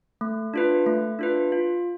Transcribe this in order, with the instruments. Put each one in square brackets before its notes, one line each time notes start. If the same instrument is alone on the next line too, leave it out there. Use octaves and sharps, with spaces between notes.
[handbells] A3
D4 F4 B4
A3
D4 F4 B4
F4